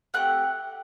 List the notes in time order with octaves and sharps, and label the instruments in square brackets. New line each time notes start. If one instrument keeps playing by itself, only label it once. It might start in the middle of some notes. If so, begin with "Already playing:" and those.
[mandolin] A3 C4 G4 F#5 F#6